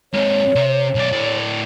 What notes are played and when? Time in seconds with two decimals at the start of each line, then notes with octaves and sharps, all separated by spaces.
0.13 G#2 C3 C#5
0.55 C3
0.95 B1 D5
1.12 A2 D5